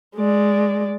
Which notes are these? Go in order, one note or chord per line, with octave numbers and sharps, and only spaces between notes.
G#3 D5